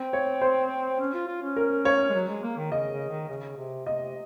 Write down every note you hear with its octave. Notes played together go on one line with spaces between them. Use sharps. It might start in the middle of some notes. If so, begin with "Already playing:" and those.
Already playing: C4
C#5
C5
C#4
F4
F4
C#4
A#4
C#5
G#3
F#3
G#3
A#3
D#3
C#3 D#5
C#3
D#3
C#3
C3
C3 D#5